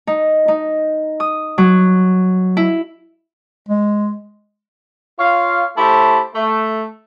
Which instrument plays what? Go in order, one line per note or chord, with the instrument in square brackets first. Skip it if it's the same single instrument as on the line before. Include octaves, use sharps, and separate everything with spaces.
[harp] D#4
D#4
D#6
F#3
E4
[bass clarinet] G#3
[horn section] F4 C#5 F5
A3 E4 G4 C5 A5
A3